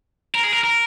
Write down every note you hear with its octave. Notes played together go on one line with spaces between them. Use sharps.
A#4
G#4
A#4
A#4